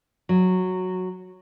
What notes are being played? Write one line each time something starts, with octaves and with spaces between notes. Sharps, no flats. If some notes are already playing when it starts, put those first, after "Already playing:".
F#3